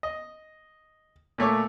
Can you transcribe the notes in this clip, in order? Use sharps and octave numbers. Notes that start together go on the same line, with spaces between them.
D#5
A#2 A3 C#5 D6